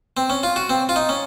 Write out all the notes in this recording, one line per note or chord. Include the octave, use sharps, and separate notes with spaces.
C4
C#4
F4
F#4
C4
F4
D#4
C#4